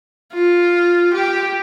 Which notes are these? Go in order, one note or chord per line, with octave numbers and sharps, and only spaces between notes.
F4
G4